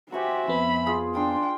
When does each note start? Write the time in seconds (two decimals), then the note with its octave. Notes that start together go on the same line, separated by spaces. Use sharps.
0.12 F#4 G4 C5 E5 G#5 C#6
0.48 F2 B3 B5
0.86 F4 G#4
1.15 D4 F4 G5 C6